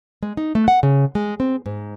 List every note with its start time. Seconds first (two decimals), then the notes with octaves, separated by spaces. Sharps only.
0.23 G#3
0.37 D#4
0.55 A3
0.68 F#5
0.83 C#3
1.15 G#3
1.40 C4
1.66 G#2